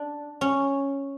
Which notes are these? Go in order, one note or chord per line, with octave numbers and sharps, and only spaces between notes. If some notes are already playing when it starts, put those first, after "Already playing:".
Already playing: D4
C#4